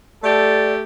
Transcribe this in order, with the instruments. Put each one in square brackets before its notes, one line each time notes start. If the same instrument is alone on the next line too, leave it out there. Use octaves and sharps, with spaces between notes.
[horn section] A3 G4 A4 [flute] D5